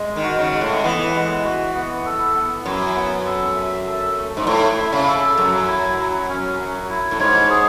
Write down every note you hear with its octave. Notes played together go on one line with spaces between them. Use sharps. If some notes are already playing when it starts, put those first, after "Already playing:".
Already playing: G#3
D#3
F#4
C#3
G#3
A2
E3 B3
G#3
F#4
B3
A4
B3
F#2 E4
B3
A4
E5
A4
A3
G#2
A2 E4
E5
C#3
A4
F#2 F#3
E4
F#3
C#4
F#3
E4
A2
G#2 C#5
G#4